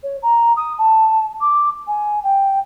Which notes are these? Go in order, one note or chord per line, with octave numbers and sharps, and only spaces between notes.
C#5
A#5
D#6
A5
D6
G#5
G5